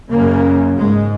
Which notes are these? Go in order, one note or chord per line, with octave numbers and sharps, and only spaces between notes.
F#2 C#3 A#3
G#2 G#3